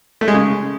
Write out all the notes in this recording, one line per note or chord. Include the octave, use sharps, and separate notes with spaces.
A3
G#3
C#3